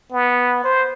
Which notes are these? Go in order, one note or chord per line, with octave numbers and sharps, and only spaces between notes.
B3
C5